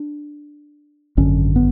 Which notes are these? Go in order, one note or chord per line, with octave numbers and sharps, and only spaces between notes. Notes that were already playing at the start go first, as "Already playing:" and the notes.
Already playing: D4
G#1 F#2 D3 C#4
B3